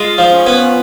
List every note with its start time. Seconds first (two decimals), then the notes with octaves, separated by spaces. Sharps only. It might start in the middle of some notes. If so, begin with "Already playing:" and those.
Already playing: G#3 F4
0.18 F3
0.33 C#4
0.46 B3